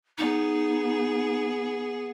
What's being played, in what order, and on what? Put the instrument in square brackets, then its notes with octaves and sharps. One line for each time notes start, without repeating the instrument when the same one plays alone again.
[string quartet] B3 G#4 [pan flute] D#4